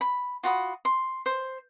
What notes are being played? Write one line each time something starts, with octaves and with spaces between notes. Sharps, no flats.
B5
F4 F#4 B5 D#6
C6
C5